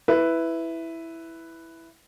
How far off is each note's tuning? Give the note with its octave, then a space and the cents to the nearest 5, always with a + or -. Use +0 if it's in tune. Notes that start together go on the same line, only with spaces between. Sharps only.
E4 +0 B4 +5